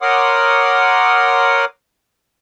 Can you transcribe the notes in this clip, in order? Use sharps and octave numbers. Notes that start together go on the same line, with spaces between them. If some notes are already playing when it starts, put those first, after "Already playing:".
A#4 C#5 F#5 C6 D6 D#6